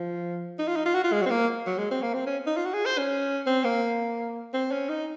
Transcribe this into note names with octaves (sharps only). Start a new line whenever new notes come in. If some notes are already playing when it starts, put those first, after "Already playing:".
Already playing: F3
D#4
F4
D#4
F4
F#4
F4
G#3
F#3
C4
A#3
F#3
G#3
C4
A#3
C4
C#4
D#4
F4
F#4
G#4
C5
C#4
C4
A#3
C4
C#4
D#4